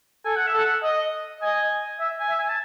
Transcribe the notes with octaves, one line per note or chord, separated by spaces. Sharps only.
A4 G#5
F#5
E5
A4 F#5
D#5
D#5 G#5
E5
G#5
E5
G#5
A5